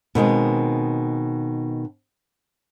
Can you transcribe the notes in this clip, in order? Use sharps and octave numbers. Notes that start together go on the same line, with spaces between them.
B2 D#3 G#3 C4